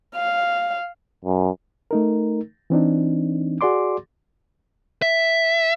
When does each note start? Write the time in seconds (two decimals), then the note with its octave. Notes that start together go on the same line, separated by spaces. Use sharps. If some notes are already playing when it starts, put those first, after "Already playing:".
0.16 F5
1.25 F#2
1.91 A3 D#4 A#4
2.70 E3 C4 D4 D#4
3.61 F#4 G#4 D5 C6 D6
5.02 E5